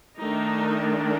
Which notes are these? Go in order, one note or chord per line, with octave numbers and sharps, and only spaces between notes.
D#3 A3 D4 D#4